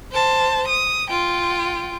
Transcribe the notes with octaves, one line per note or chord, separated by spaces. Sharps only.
C5 A5
D#6
F4 G5